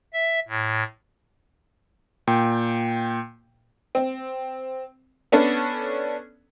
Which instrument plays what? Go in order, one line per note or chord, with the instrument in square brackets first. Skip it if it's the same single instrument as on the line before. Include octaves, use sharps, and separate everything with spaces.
[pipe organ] E5
A2
[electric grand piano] A#2 G5
[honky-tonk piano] C4
B3 C#4 D4 A4